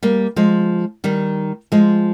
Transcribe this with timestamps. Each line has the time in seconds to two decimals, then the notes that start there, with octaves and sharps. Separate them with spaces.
0.03 G3 A#3
0.36 F3 G#3
1.04 D#3 G3
1.72 F3 G#3